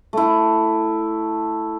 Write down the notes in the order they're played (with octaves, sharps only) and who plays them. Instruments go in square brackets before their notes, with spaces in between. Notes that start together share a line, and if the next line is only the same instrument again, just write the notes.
[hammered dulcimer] A3 E4